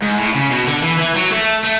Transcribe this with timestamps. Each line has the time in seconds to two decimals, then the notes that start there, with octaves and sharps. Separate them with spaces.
0.02 G#2
0.18 A2
0.35 C#3
0.51 B2
0.67 D3
0.83 E3
0.99 E3
1.16 F#3
1.32 A3
1.64 A3